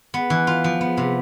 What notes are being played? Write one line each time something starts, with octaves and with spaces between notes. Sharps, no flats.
B3
E3
F4
F3
B3
C3